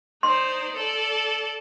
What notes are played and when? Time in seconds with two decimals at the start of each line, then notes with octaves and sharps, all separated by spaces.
0.23 D#4 C5 D5 C6
0.76 A4 D5